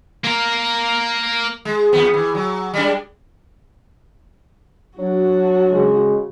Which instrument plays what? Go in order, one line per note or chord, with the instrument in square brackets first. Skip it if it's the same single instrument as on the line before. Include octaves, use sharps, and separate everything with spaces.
[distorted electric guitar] A#3 A#4
[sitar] G#3
E2 B3
E3
F#3
G3 G#3 D4
[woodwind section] F#3 D4 [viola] F#4
[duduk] C#3 [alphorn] G#3